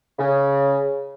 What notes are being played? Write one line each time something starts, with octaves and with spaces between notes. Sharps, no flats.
C#3